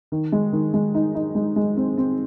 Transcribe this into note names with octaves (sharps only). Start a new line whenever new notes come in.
D#3
G#3
D#3
G#3
D#4
D#4
G#3
G#3
C4
C4